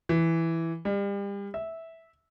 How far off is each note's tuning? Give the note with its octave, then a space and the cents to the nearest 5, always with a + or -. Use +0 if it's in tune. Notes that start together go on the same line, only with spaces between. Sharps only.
E3 +0
G3 +35
E5 -10